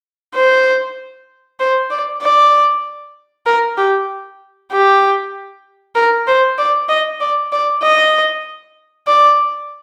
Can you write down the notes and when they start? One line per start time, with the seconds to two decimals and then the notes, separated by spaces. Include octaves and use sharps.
0.35 C5
1.60 C5
1.91 D5
2.23 D5
3.46 A#4
3.77 G4
4.72 G4
5.95 A#4
6.27 C5
6.58 D5
6.89 D#5
7.20 D5
7.52 D5
7.83 D#5
9.08 D5